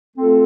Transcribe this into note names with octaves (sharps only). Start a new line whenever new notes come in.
A3 C4 F4 A4